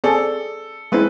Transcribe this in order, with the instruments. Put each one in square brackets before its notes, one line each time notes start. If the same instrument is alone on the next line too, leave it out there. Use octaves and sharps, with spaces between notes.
[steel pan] C4 G#4 D5 [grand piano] A4
[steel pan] G#3 C4 E4 [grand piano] B4